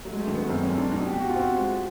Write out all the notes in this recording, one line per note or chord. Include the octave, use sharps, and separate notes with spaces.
F#3 A3
G#3
A3
D#3
B3
F#2 C4
C#4
F#2
D4
B2 D#4
G4
B2
F#4
F4
C4 F#4
G#3